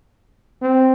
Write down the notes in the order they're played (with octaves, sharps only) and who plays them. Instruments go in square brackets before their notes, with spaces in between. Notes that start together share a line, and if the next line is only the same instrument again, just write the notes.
[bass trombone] C4